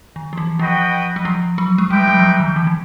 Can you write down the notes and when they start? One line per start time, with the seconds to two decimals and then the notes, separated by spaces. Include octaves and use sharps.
0.16 D#3
0.33 F3
0.37 E3
0.59 F3 F#4 B4 D#5 G5
1.16 F#3
1.25 F3
1.58 F#3
1.78 G#3
1.90 G3 D#4 G4 B4 E5 G5
2.08 F#3
2.19 F3
2.23 F#3
2.40 D#3
2.56 E3
2.67 E3